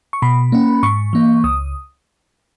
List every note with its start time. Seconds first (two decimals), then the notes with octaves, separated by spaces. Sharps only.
0.13 C#6
0.22 B2 B5
0.52 A#3 C#4
0.83 G#2 C#6
1.13 E3 A#3
1.44 C#2 D#6